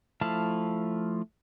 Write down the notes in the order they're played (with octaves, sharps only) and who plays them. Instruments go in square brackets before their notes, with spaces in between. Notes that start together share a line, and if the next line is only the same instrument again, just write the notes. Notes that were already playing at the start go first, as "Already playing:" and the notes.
[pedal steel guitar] F3 A3 E4 F5 A5